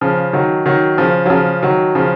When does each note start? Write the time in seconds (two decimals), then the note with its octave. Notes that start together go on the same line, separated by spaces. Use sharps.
0.01 C#3 F3
0.33 D#3 F#3
0.65 D#3 F#3
0.98 C#3 F3
1.26 F#3
1.30 C#3 F3
1.63 D#3 F#3
1.95 C#3 F3